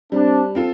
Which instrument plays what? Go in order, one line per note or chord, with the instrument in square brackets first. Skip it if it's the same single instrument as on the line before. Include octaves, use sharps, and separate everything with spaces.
[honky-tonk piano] G3 [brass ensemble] C4 D4
[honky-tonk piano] C4 F4 A4